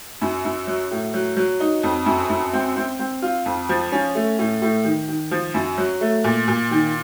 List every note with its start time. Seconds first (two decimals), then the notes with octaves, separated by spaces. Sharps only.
0.21 F#2
0.45 F#2
0.67 F#3
0.91 A2
1.14 F#3
1.37 F#3
1.60 D#4
1.83 F2
2.06 F#2
2.30 F#2
2.53 C4
2.76 C4
2.99 C4
3.22 F4
3.46 F2
3.69 F3
3.92 C#4
4.15 A3
4.39 A2
4.62 A2
4.85 D#3
5.08 D#3
5.31 F3
5.54 F#2
5.78 F#3
6.01 A3
6.24 A#2
6.48 A#2
6.71 D#3